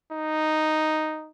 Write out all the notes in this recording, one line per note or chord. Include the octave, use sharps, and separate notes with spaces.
D#4